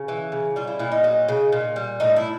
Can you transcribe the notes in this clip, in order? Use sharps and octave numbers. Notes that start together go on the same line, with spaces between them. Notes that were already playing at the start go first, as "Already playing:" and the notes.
Already playing: C#3
E3
C#3
G3 F4
E4
A#2 E4
D#4
F#3 D#4
C#3
A#2
G3
A2 D#4
E4